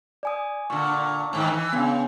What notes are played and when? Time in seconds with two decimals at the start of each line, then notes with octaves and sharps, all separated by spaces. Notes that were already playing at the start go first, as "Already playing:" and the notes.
0.23 D5 G#5 D#6
0.70 A#2 D3 C#6
1.33 G#2 D#3 E3
1.54 E3
1.73 C#3 B3 D4 G5